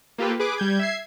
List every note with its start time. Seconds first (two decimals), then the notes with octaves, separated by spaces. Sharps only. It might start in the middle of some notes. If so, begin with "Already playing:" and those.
0.18 A#3 F4 G4 A4 B4
0.39 G#4 B4 D6
0.58 G3 G6 G#6
0.79 E5 G#6 C7